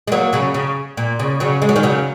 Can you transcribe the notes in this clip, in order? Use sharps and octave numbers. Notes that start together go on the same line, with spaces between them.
G#3
F#3 A#3
C#3 F#3
C#3
A#2
C#3
C#3 F#3
G#3
F#3
D#3 G#3
C#3 F#3